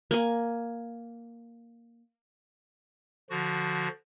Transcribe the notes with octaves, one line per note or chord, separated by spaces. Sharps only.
A#3 G#5
D3 F3 F#4